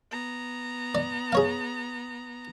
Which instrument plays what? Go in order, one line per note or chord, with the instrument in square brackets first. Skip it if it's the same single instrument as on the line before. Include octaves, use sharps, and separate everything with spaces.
[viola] B3 A#5
[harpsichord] D5
G#4 C#5 F5